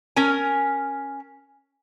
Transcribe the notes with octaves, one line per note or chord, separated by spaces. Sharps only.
C#4 A#4 G#5